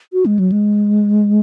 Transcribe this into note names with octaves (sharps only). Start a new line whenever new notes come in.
F#4
G#3
F#3
G#3